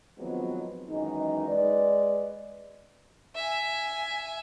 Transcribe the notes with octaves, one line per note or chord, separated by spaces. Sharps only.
D#3 F3 F#3 G#3 B3 C4
F#2 D#3 E3 G#3 D#4
G#3 B4 D5
E5 G#5